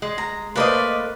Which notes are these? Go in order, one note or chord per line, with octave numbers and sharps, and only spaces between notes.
G#3
A#5
A3 A#3 B4 C5 D5 D#5